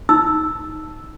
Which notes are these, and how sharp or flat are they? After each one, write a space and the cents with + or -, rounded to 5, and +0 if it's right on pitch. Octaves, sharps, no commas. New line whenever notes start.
D#4 +5 E6 +0